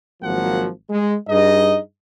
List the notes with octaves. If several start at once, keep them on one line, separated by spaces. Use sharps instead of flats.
G#1 F3 F#3 A#3 F#5
G#3
G2 D#4 G#4 D#5